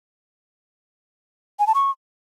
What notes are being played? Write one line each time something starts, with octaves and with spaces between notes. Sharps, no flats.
G#5
A5
C#6